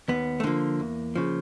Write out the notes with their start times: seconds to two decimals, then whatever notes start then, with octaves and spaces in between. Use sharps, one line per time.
0.08 D#2 B3
0.40 A3
0.44 D3 F3 A#3
0.80 E2
1.16 C#3 F3